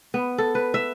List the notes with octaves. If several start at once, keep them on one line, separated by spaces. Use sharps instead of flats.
B3
A4
B4
E5